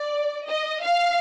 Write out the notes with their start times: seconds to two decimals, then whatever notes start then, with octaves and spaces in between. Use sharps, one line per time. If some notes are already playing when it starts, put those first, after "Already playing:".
Already playing: D5
0.48 D#5
0.84 F5